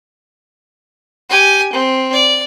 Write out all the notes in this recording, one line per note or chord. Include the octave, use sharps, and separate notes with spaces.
G4 G#5
C4
D5